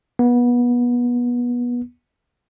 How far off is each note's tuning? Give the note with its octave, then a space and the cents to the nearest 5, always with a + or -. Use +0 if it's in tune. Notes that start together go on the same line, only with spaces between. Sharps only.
B3 -25